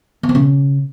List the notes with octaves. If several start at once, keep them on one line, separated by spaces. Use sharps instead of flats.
B3
C4
C#3